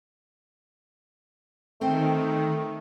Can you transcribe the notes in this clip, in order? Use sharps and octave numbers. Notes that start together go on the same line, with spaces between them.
D#3 A3 C4 C5 G5